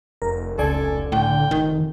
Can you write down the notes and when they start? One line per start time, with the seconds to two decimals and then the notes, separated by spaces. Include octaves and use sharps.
0.22 F1 A#4
0.58 C#2 A4 D5 G#5
1.12 A2 D3 G5
1.51 F1 D#3